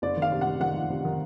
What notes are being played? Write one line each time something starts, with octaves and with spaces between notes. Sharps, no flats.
F#1 D5
D#3
F5
C3
F#5
C3
D#3 F#5
F2
C3
D#3